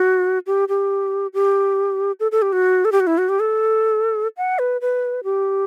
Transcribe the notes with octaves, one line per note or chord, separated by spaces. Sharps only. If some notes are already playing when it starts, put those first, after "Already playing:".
Already playing: F#4
G4
G4
G4
A4
A4
G4
F#4
A4
G4
F#4
E4
F#4
G4
A4
F#5
B4
B4
G4